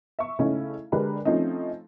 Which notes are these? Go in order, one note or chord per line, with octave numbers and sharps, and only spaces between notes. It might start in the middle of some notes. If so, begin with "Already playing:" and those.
E5 C#6
C#3 A3 C#4 D#4 E4
D3 G#3 D4 G4 A#4 B4
F3 A3 C4 C#4 D#4